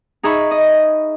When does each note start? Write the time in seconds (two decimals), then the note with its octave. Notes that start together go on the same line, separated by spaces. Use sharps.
0.23 D#4 G#4 E5 B5 C#6
0.51 D#5